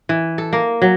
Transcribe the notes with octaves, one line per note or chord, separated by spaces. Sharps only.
E3
A4
A#3
F#3